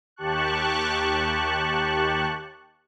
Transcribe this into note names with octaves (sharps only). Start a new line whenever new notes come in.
D#2 G4 A5 C#6 F#6